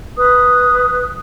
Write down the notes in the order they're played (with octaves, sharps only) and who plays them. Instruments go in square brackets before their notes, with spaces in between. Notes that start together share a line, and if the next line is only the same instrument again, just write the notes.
[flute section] B4 D#6